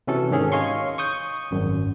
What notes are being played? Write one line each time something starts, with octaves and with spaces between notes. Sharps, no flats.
C3 E3 C#4 F#4 A4
G#2 D#3 C#4 G#4
C#5 D#5 F5 G#5 C6 C#6
C#6 D#6 G6
G#1 F#2